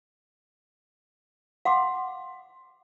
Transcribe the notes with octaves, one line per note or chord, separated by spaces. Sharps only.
F5 F#5 C6 D6